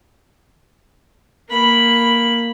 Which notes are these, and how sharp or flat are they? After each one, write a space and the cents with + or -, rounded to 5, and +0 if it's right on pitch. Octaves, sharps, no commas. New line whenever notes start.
A#3 +0 B5 +0